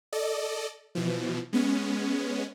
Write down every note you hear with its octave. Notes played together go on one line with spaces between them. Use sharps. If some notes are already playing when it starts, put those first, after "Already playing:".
A4 D5 D#5
B2 E3 F3
G#3 B3 C#4